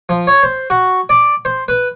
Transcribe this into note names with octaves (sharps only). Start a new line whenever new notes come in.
F3
C#5
C5
F#4
D5
C5
B4